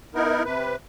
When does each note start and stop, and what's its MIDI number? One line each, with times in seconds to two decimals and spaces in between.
0.15 0.43 59
0.15 0.43 63
0.15 0.43 64
0.15 0.43 70
0.45 0.76 48
0.45 0.76 71